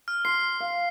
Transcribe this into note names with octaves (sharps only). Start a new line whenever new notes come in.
F6
C6 C7
F5